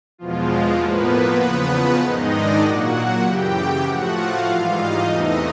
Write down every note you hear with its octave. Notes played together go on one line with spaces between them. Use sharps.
E2 B2 F3 G#3 F4
A2 F3 A#3 B3 B4
E2 C#3 F3 B3 B4
G#2 D#3 G#3 D#4 D#5
D4 D5
A#2 F#3 A#3 F#4 F#5
F#2 C#3 E3 G4 G5
A2 F3 A3 F#4 F#5
F4 F5
G#2 E3 G3
D#4 D#5
E2 C3 E3 A3